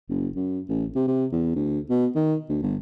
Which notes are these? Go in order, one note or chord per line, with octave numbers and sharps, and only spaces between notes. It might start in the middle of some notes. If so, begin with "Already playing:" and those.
F#1
F#2
A1
C3
C3
E2
D2
B2
D#3
D2
G1